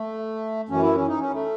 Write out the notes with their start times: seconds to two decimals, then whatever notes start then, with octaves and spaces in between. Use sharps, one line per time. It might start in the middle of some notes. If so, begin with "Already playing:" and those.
Already playing: A3
0.69 F#2 E3 C#4
0.83 E4
0.95 C#4
1.08 D#4
1.20 C#4
1.33 A3